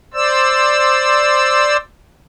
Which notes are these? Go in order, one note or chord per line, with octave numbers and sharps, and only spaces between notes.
C5 D5 E6